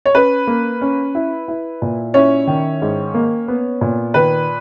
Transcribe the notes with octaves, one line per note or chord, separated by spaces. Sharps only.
C#5
C#4 B4
A#3
C#4
E4
E4
A#2
C#4 E4 C#5
D#3
G#2
A#3
B3
A#2
D#3 B4